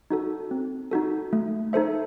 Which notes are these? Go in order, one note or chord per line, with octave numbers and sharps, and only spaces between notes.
D#4 F#4 A4
C4
D#4 F#4 A4
A3
D#4 A4 C5 E5